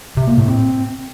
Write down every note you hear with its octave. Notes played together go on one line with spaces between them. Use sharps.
C3
A#3
A2
C4